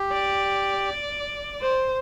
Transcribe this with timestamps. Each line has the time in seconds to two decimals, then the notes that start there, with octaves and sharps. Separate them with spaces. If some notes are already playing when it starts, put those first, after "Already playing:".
Already playing: G4
0.13 D5
1.61 C5